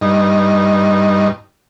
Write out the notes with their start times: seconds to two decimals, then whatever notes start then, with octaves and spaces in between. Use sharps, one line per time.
0.01 G2 D#4